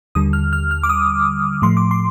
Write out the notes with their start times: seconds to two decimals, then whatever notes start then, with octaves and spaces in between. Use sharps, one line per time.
0.15 D#2 D3 G3 D#6
0.33 F6
0.53 F6
0.71 F6
0.83 D6
0.89 D#6
1.62 A2 F3 A3 C6
1.77 D6
1.91 C6